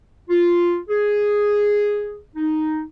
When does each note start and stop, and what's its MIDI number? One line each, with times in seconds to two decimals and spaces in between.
0.29 0.78 65
0.89 2.20 68
2.36 2.82 63